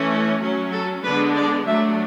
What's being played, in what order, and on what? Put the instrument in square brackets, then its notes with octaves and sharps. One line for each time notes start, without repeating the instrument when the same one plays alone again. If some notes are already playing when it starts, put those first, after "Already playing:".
Already playing: [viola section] E3 A3 C#4
F#3 C#4
A4
D3 G#3 B3 D4 B4
D5
F#3 A3 D4 E5